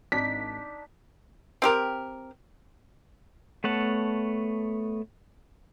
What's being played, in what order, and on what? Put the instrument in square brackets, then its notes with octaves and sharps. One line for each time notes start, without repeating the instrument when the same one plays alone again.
[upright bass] G#1 [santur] D4 D#4 [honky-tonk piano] B6
[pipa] C4 G4 A#4
[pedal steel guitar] A3 B3 C#5 F#5 A5